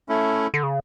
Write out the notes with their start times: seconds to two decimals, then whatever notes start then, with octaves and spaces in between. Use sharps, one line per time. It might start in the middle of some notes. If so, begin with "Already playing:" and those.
0.09 A3 C#4 E4
0.54 D3
0.63 C#3